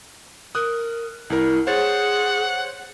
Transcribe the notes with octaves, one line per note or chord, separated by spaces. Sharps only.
A#4 D#6 F#6
C2 E4 A#4
G#4 C5 C#5 F#5 A6